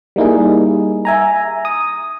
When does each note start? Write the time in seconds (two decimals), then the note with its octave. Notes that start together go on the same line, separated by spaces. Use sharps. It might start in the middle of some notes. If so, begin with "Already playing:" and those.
0.16 G3 A#3 D#4 E4 G#4
1.05 E5 G#5 A#5
1.65 D#6